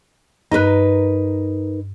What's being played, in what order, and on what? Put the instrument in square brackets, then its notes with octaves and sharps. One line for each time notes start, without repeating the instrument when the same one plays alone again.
[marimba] G2 F#6 [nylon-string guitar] D#4 A#4 B4